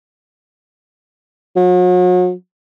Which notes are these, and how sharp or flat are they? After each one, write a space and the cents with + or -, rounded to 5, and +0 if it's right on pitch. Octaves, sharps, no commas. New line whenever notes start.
F#3 -40